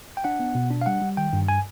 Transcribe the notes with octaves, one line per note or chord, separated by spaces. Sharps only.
G5
D4 F#5
B3
B2
D4
F5
G3 F#5
G3
D#3 G5
G2
G#5